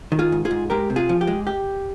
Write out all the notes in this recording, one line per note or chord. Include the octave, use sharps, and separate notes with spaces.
D#3
F4 G#4
G#2
F4 G#4
G#2
G#3 G4 A#4
C3
F4 G#4
F3
G4
G#3
G4